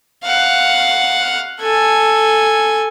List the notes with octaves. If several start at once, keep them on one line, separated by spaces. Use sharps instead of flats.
F5 F#5
A4 G#5